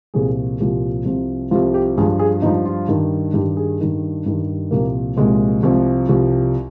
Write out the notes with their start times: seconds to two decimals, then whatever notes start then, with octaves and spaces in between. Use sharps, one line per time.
0.14 C2 A#2 F3 G#4
0.60 C2 A#2 F3 G4
1.05 C2 C3 F3
1.51 C2 C3 F3 F4
1.74 G4
1.98 G2 F3 G#4
2.19 G#4
2.42 G2 F3 D#4
2.65 F4
2.89 G2 D#3
3.34 G2 D#3 G4
3.57 G#4
3.80 G2 D#3
4.26 G2 D#3 G4
4.71 C2 A#2 F3 A#3
5.16 C2 A#2 F3 G#3
5.63 C2 C3 F3
6.09 C2 C3 F3